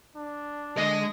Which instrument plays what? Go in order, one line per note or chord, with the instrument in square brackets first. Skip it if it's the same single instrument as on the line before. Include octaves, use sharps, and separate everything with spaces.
[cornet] D4
[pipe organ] D3 D#6 A#6 [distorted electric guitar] G#3 D#5